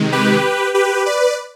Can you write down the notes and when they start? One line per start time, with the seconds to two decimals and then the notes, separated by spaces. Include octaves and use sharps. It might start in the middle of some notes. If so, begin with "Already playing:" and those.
Already playing: C3 D#3 G#3
0.12 G4 B4
0.74 G4 B4
1.06 B4 D5